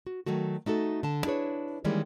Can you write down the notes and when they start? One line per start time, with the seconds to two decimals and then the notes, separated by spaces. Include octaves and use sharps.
0.06 F#4
0.26 D#3 F#3 A3 F#4
0.66 A3 D#4 F#4 A4
1.03 D3 A5
1.24 D4 E4 G#4 B4 C#5
1.84 D#3 E3 G3 G#3 A#3 C#4